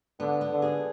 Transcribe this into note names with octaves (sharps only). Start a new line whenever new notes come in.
D3 B3
B3
D3
G#4